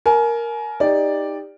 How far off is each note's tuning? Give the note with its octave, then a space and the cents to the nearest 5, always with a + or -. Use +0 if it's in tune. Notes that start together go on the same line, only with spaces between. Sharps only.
A#4 +0 G#5 +35
D#4 +0 G4 +25 D5 +0